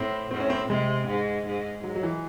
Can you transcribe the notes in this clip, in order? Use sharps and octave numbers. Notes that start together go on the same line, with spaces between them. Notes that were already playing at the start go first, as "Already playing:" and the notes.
Already playing: A2 C4
A2 C4
C#4
C4
C3 G#3
G#2
G#2
G#2 F#3
F#3
E3